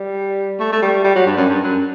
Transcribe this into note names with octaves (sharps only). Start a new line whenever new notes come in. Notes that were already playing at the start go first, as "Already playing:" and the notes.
Already playing: G3
A3
A3
G3
G3
F#3
G2
F#2
G2
F#2